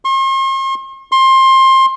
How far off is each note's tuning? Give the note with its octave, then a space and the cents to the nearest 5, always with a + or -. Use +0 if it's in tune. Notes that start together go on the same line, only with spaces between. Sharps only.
C6 +45
C6 +25